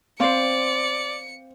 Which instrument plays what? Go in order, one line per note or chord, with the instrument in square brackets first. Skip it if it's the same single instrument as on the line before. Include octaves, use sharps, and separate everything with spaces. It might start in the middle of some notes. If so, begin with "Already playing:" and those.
[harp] C4 C5 [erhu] D5 [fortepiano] F5 [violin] C#7